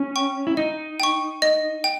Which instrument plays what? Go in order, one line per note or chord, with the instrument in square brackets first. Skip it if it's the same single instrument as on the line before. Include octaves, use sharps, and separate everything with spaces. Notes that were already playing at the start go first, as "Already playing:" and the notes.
Already playing: [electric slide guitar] C#4
[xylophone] G5 C#6
[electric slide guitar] E4
[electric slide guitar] D#4 [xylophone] D#5
[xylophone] G5 C#6
D#5
G5